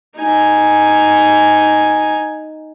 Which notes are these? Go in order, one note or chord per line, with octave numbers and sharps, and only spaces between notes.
D#4 G#5